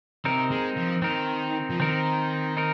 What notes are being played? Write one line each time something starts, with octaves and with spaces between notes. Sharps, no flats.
C3 C4 D#4 A#4
G#3
F3
D#3 C4 D#4 A#4
F3
D#3 C4 D#4 A#4
C4 D#4 A#4